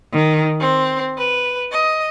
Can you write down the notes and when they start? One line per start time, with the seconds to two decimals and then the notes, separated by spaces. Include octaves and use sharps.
0.13 D#3
0.60 C4
1.18 B4
1.71 D#5